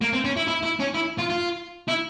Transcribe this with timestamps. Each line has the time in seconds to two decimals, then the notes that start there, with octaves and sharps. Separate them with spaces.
0.02 A#3
0.13 C4
0.25 C#4
0.37 E4
0.48 E4
0.63 E4
0.80 C#4
0.95 E4
1.19 F4
1.30 F4
1.88 E4